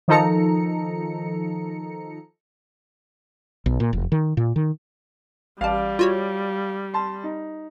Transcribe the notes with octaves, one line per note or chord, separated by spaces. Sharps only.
D#3 F3 D#4 A4 A#5 C#7
B1
A#2
F1
D#3
A#2
D#3
A1 G3 D5 F5 A5
F4 F#4 C#5
A5 C6
D#4